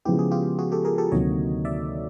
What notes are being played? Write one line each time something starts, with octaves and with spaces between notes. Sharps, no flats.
C#3 F3 G#3 B3 E4 G4
G#4
F4 G4
F#4 G#4
G4 A4
G#4 A#4
G4 A4
D2 C3 D#3 F#3 A#3 C#5 D#5
D5 E5